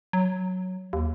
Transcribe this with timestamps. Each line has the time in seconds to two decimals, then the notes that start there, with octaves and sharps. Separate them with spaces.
0.13 F#3
0.93 D#2